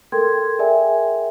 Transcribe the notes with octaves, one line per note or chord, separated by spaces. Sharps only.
A4 A#4 G5 C6 G#6
G#4 A#4 D5 E5 G5 G#5